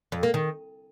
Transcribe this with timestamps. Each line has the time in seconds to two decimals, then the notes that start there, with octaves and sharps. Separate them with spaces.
0.12 F2
0.23 A#3
0.34 D#3